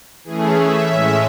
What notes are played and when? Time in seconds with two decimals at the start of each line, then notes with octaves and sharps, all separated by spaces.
0.24 E3 A3 C#4 G#4
0.57 E5
0.89 A2 G#3 C#4 E5